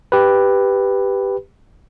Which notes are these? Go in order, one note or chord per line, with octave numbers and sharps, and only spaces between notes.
G4 B4